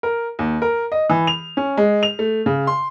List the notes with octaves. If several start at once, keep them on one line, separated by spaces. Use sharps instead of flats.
A#4
D#2
A#4
D#5
E3
F7
C#4
G#3
F7
A3
C#3
C6